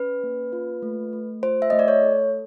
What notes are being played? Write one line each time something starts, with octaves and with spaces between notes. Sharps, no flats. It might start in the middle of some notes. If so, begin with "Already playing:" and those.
Already playing: C#4 B4
A#3
F4
A3
A3
F4 C5
E5
A3 D#5
D5
C#5
A4